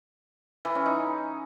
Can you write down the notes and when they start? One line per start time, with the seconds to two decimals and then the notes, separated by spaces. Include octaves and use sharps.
0.65 E3
0.75 C#4
0.86 D#4